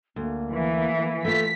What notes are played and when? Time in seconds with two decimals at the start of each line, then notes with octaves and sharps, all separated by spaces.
0.16 D2 A#3
0.53 E3
1.25 A3 F4 B6